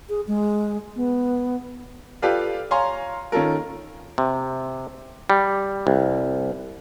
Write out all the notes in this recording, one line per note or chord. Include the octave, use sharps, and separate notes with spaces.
G#4
G#3
B3
F4 G4 A4 B4 D5 F5
C#5 F5 G#5 A#5 C6
D#3 C#4 F4 A4 A#4
C3
G3
C2